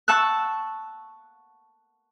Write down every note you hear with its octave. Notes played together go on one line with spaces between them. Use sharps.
F#5 A5 C#6 E6 F#6